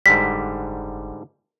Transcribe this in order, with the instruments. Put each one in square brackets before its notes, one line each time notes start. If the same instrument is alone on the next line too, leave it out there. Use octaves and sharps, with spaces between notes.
[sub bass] F#1 [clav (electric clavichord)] G#2 D3 G3 [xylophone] B6